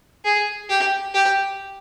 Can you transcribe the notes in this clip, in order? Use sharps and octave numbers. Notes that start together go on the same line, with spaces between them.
G#4
G4
G4